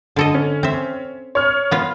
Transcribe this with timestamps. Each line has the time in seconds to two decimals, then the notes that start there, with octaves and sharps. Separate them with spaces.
0.16 D3 A4 D#5
0.34 C#4
0.63 C4 E5
1.35 C#5 F6
1.71 B3 F4